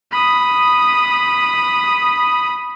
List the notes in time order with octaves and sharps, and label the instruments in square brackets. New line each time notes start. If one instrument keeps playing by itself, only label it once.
[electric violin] B5 D#6